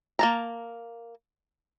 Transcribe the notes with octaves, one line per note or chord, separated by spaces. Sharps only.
A#3 A5 A#5